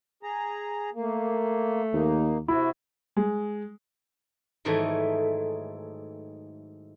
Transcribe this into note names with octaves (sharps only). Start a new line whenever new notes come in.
G#4 A#5
A3 A#3
D#2 A#3 D#4
C3 E4 F#4
G#3
G#2 D#3 E3 F#3 A3